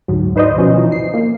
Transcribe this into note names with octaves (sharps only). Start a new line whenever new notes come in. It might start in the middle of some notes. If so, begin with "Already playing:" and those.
D2 G#2 F#3
D#4 B4 C5 D5 D#5
B2 F3 F#3 C#4
E3 F3 D#4
C7
A#3